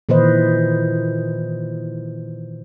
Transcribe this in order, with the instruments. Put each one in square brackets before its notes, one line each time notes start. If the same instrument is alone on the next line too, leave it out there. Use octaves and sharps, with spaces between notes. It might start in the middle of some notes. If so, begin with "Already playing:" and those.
[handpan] A#2 D#3 E3 B4 C5 D#5